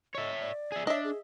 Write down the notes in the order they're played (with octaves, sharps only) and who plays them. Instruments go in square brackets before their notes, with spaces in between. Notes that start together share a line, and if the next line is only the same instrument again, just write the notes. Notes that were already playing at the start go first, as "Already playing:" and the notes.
[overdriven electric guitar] C#5 E5 [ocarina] D#5
[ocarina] D5
[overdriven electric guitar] G#4 E5
[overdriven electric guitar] D4 [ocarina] C#5 [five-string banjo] D#5 E5
[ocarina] G#4